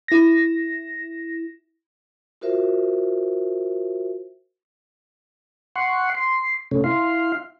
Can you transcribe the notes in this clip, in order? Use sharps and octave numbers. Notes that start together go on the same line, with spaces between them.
E4 A#6
F4 F#4 A#4 C5 E5
F#5 C6 C#6
C6
C3 A3 C#4
E4 F5 C6